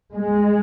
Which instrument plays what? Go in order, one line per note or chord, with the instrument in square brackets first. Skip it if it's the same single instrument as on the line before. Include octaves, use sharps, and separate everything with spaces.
[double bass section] G#3